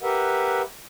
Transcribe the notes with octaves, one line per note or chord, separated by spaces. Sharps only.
G4 A#4 B4 E5 F#5